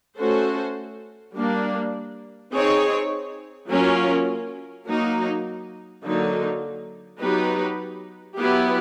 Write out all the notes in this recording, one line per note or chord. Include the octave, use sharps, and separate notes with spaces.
A3 C#4 F#4 A4 C5
G3 A#3 D4
C4 D#4 G#4 C#5
F#3 A#3 C#4 F4 A#4
F#3 A#3 D#4
D3 F#3 A#3 D#4
F#3 B3 D#4 G4 B4
F#3 B3 E4 G4